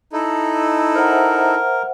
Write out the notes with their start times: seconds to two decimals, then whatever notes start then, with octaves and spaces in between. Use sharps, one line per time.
0.13 D#4 E4 A4
0.95 A#4 C5 E5 F#5